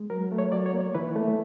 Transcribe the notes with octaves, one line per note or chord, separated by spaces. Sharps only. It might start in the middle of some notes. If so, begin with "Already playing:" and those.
Already playing: G#3
F#3 A#4
A3
C#5
F#3 D5
C#5
A#3
C#5
E3 B4
A3